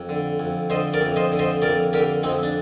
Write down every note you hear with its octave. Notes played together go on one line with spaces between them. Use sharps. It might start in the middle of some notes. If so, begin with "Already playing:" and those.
Already playing: F2
D3
F2
D3 C5 D#5
A#4 D5
F2
C5 D#5
D3
C5 D#5
F2 A#4 D5
D3 G4 A#4
F2 C4 D#4
D4